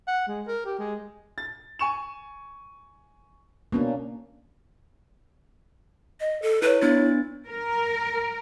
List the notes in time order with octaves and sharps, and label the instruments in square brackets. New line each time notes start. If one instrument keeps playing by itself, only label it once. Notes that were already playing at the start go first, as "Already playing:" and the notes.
[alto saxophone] F#5
G#3
A#4
G4
G#3
[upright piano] A6
G#5 C#6 E7
[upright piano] B2 [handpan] A#3 C#4 D4
[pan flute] D#5
A4
[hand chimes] E4 C#5 [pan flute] B4
[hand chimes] B3 D4 A6 [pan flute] E4
[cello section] A#4